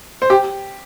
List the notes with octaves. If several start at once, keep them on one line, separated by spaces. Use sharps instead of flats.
C5
G4